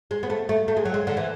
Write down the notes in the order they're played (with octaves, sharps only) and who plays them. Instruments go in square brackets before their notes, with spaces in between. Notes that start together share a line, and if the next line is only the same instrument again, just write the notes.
[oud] G#3
B3
A3
A3
A3
G#3
F#3
G#3
D3
E3